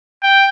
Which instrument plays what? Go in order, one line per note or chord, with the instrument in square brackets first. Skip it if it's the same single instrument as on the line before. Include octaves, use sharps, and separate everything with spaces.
[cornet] G5